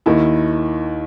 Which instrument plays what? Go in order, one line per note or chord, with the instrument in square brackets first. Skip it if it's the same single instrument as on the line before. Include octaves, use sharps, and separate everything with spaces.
[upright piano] D#2 D#3 E4